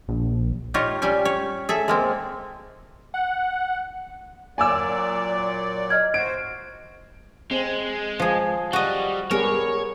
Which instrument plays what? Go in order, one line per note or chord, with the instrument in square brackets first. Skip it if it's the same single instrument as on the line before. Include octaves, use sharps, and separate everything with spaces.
[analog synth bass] A#1
[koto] D#4 F4 G4 C#5 D#5
G3 C#4 G4 G#5
C#5
G#4 A4 E5
G#3 A#3 C4
[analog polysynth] F#5
[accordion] A#2 F#3 D5 [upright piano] G#5 D6 E6
[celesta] D#5 F6 G#6
[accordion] F#4 C5 [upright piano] D7
[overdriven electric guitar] G#3 [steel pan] C4
[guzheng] F3 G#4
[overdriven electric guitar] G3 [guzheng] F#4 D#5
[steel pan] G3 B3 G#4 [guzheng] A#4 [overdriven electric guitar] C#5